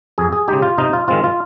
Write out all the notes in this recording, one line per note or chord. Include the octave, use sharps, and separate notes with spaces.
F2 G#4
G#4
C#3 G#3 D#4 G4
F4
C3 D#4
F4
D#3 G#3 C4 F4
F4